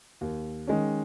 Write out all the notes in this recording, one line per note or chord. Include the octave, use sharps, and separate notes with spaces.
D#2
D#3 G#3 C#4